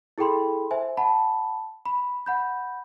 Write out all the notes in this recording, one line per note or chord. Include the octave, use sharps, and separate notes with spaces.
E4 G#4 A4 G5 B5 C6
C5 E5 G#5
F#5 A5 B5
B5
F#5 B5 G6